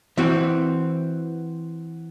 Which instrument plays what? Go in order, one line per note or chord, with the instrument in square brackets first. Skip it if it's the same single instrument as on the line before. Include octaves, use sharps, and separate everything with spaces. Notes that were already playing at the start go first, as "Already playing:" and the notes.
[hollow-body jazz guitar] E3 C4 F#4